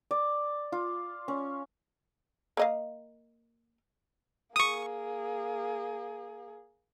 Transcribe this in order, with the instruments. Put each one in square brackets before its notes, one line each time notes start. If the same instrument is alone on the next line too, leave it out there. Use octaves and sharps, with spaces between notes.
[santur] D5
F4
C#4
[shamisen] A#3 D#5 F5
[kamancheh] A#3 G#4 [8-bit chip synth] C#6 D#6